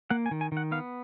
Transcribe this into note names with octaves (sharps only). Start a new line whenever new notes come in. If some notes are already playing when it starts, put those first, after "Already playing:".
A#3 F#5
G#5
D#3
G#5
D#3 F#5
B3 F5